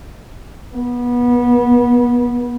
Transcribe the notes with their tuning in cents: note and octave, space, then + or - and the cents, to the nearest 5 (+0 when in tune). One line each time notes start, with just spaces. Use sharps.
B3 -25